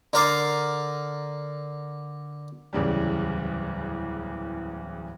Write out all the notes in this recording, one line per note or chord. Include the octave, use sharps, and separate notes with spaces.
D3 A#4 D5 C6
D1 E2 C#3 G3